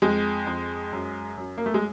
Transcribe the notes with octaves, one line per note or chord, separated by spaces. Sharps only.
F2 G#3
F2
F#2
F#2
A#3
A3
G#3